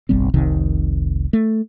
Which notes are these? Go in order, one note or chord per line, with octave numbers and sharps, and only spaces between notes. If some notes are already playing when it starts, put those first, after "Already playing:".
F#1 B1 G3 C4
F1 C2 C3 D#3
A3